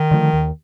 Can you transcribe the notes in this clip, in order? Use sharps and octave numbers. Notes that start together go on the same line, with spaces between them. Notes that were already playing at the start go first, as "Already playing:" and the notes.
Already playing: D#3
D3 F3 A3
D#2